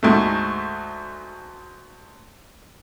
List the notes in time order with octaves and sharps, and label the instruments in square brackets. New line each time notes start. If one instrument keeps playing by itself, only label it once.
[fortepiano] D2 G#2 A3